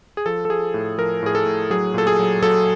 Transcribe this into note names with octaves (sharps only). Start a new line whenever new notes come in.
G#4
F3 A4
A4
F3 G#4
A2
F3 A#4
A2 G#4
A4
A2
F#3 G#4
A#2 A4
G#4
F#3
F#3 A4